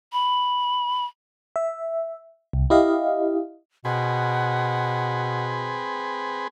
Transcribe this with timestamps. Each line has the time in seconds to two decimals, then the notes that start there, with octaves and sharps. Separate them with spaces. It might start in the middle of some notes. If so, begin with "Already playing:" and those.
0.13 B5
1.56 E5
2.53 C2
2.70 E4 G4 D#5 F5
3.85 B2 C4 G#4 B4 F#5